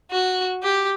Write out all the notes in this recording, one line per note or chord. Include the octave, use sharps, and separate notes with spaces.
F#4
G4